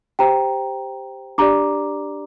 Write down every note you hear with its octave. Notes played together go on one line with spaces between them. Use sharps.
G4 C5 G5 A#5
D4 G4 D5 A#5 D6